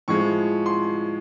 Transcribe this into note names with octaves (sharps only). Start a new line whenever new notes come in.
A2 F3 G#3 C#6
C6